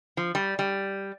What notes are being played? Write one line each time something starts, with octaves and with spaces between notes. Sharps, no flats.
F3
G3
G3